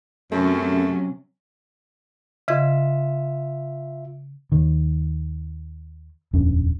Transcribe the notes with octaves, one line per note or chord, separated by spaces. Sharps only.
F#2 C3 F#3 A3 C#4
C#3 F4 D#5 E5 G#6
D#2 D#3
D#1 F2 C#4 D4